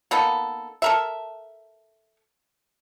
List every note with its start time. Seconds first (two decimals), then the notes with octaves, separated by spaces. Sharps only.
0.11 A#3 B3 D#4 A4
0.82 A4 A#4 E5